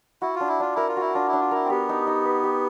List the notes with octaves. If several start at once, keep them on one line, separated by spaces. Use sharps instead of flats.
E4 F#4
F4
D4
E4
D4 F4
E4 A#4
F4
E4 F#4
D4 F4
E4
D4
F4
E4 A#4
C4
B3 G4
D#4
D#4
B4
G4